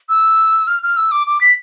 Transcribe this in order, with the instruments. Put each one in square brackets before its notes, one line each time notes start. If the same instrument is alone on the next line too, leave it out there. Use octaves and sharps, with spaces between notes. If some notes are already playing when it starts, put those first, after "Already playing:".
[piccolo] E6
F6
F6
E6
D6
D6
B6